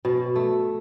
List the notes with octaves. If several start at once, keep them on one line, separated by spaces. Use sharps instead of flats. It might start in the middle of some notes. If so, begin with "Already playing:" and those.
B2
A3